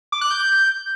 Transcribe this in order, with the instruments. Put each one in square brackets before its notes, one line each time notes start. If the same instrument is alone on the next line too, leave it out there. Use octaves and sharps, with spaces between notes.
[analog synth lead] D6
F#6
G6